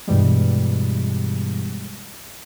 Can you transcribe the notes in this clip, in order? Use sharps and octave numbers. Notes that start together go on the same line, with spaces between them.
G2 B2 E3 G3 G#3